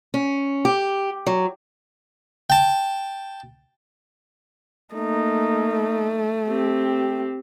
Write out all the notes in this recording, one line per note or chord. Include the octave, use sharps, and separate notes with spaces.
C#4
G4
F#3
G5 A5
A3 A#3 D#4
C4 G4